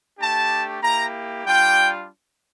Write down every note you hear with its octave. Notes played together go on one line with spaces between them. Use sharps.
A3 D4 G4 A5
A#3 E4 G4 A#5
G3 D4 F4 G5